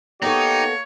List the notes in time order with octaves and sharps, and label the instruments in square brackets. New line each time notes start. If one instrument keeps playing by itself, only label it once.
[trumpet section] A#3 C#5 [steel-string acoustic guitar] B3 A4 [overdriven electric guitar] D#4 [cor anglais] G4